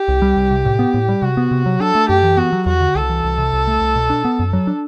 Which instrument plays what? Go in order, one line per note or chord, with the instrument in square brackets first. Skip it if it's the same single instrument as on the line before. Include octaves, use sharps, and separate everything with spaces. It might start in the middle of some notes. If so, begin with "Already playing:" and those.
Already playing: [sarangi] G4
[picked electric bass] C2
G3
C2
C3
A2
B3
A2
G3
[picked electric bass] C3 [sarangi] F#4
[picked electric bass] B3
C3
F#3
[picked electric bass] D4 [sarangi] A4
[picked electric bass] A3
[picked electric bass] F#2 [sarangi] G4
[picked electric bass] E3
[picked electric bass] B3 [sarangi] F#4
[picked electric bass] F#3
[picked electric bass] E2 [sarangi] F#4
[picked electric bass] D3
[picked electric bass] C2 [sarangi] A4
[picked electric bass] E3
C2
C3
C2
A3
C2
B2
D4
B3
F#2
F#3
D4